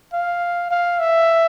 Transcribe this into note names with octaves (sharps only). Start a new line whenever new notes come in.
F5
F5
E5